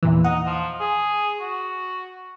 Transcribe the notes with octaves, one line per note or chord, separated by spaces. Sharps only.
E2 A#2 E3
D#4 F#5
F3
G#4
F#4